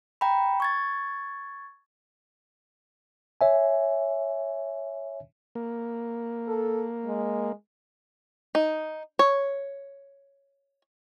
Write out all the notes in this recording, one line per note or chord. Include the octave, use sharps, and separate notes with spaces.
G5 A#5 B5
C#6 G#6 A6
C#5 E5 G#5
A#3
A4
G#3
D#4
C#5